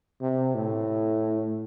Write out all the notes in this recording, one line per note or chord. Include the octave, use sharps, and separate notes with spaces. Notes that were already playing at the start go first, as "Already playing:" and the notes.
C3
A2